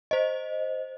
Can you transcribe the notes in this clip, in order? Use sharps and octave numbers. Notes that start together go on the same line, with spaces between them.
C5 D#5